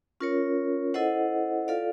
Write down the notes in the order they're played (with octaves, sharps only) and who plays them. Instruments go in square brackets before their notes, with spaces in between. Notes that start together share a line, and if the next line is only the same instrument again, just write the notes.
[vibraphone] C#4 F4 A#4 C#5
E4 A4 C5 D#5 F#5
F4 A4 D5 F5